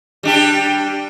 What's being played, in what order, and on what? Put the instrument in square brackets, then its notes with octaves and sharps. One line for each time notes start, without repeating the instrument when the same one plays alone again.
[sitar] G3 D4 G4